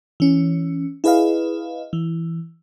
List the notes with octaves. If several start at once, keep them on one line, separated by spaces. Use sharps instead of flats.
E3 C#4
E4 G#4 B4 D#5 F5
E3